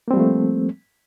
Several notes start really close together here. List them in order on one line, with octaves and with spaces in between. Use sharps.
A#3 C4 G3 F3 A3